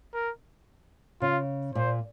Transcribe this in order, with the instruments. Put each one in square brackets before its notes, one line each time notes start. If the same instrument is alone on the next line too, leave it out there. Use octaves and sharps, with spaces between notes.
[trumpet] A#4
[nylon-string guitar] C#3 [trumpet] F4
[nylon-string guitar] A#2 [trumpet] C5